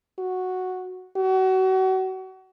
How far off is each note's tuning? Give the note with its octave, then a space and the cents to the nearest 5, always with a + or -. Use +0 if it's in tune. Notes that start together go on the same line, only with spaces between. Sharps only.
F#4 -5
F#4 +30